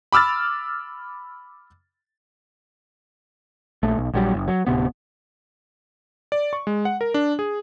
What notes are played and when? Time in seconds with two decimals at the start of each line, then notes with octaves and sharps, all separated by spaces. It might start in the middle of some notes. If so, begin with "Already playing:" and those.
0.12 B5 D6 E6 F6 A6
3.83 A#1 A3
3.98 B1
4.14 A#1 F#3 G3
4.34 F#1
4.48 F#3
4.67 D1 C3 B3
6.32 D5
6.53 C#6
6.67 G#3
6.85 F#5
7.01 A#4
7.14 D4
7.39 G#4